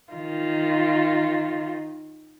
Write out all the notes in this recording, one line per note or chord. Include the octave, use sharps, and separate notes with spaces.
D#3 F4